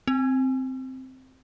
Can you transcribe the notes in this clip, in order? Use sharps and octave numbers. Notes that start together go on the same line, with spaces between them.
C4